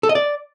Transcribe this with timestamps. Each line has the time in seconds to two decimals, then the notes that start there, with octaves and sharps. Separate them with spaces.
0.03 A4
0.09 D#5
0.15 D5